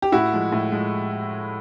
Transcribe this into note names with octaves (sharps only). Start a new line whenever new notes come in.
G4
A2 E4 F#4
F3 G#3
A2
F3 G#3